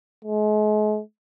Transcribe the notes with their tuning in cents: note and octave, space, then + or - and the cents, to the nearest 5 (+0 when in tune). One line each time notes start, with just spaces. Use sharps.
G#3 +40